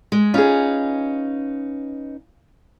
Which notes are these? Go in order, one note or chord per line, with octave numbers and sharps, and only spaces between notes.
G#3
C#4 D#4 F4 G#4 B4